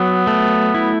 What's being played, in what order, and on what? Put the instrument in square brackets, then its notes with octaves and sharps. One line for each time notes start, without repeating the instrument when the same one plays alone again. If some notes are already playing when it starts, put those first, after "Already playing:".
Already playing: [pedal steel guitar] F#3 [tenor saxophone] B3
[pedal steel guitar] A3
E4